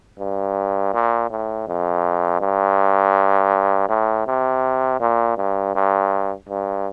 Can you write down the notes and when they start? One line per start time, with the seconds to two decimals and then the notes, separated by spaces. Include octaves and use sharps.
0.19 G2
0.94 A#2
1.30 A2
1.68 F2
2.41 G2
3.89 A2
4.27 C3
5.00 A#2
5.37 G2
5.75 G2
6.49 G2